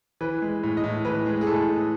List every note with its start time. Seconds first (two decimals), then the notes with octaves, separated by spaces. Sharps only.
0.21 E3 B4
0.42 G#3
0.63 A2
0.77 D#5
0.84 A2
1.05 E3 B4
1.26 G#3
1.41 G#4
1.47 A2 A4
1.67 A2